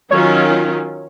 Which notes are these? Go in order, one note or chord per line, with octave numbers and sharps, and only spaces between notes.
D#3 F#3 C#4 F4 C#5